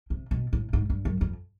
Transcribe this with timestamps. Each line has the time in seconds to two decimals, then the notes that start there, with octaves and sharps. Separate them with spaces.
0.10 C3
0.31 B2
0.53 A2
0.73 G#2
0.90 G2
1.05 F#2
1.21 F2